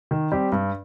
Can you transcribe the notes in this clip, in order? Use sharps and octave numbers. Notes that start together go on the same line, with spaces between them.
D#3
G3 C4 G4
G2